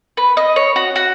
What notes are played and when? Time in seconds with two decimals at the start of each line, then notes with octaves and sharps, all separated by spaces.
0.17 B4
0.37 D#5
0.56 C#5
0.76 F#4
0.96 F#4